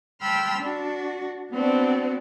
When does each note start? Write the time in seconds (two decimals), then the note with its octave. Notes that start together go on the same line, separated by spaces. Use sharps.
0.21 G5 A5 B5 C6 E6 F6
0.59 D4 F#4
1.52 B3 C4 D4 F#4